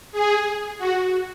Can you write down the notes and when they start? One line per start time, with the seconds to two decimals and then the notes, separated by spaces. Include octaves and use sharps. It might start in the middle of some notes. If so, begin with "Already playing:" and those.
0.12 G#4
0.78 F#4